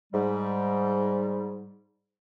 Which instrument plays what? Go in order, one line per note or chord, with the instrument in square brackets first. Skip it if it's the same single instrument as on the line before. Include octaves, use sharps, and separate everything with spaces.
[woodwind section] G#2 G3